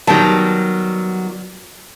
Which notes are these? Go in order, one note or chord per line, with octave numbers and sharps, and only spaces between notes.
D#3 F#3 G3 B3 G4 A5